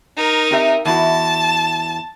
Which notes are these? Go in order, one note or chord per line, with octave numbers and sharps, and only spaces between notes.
D#4 A#4
C4 G4 E5
E2 E4 F#4 A5